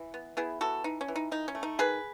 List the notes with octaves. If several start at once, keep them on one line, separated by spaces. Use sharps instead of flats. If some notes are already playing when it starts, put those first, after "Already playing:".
Already playing: E3
B3
B3 E4 G#4
E3 F#4 A4
E3 D#4
C#4
E3
D#4
D#3 D#4
C#4
A3
D#4
D#3 G#4 B4